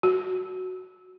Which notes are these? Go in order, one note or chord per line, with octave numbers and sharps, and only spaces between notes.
F#4